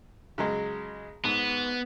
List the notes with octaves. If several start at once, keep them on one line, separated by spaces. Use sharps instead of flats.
C#3 F#3 G#3
G#2 B3